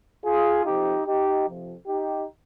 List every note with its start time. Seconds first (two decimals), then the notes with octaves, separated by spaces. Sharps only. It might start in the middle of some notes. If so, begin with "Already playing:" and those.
0.24 F4 G#4
0.65 F2 C3 F3 D#4 G4
1.06 D#4 G4
1.47 F2 C3 F3
1.87 D#4 G4